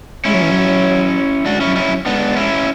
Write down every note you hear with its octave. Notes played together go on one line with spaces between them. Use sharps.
G#3 C#4 E4
F#3
E3
F#3
G#3 D4 F#4
F#3 C#4 E4
C#4 E4
F#3
G#3 B3 D4
C#4 E4